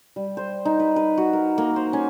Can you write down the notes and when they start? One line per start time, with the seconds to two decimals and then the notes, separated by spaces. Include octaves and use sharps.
0.16 G3
0.37 C5
0.65 D#4
0.80 B4
0.96 B4
1.18 F#4
1.33 A#4
1.58 A#3
1.76 C5
1.93 C#4